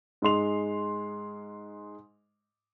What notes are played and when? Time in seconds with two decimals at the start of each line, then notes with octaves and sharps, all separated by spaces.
0.22 G#2 G#3 C6 F7